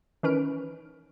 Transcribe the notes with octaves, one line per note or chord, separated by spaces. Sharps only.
D#3 E3 C#4 B4 F6 D7